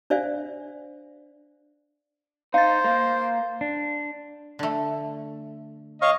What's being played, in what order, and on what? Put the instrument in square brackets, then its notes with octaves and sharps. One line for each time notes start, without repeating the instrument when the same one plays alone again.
[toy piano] D4 C5 D5 E5 F5 G#5
[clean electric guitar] D#4 [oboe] C5 [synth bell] F5 A6
[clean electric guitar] A#3
[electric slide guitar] D4
[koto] D3 A3
[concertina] C#5 F5 C#6 [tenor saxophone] D#5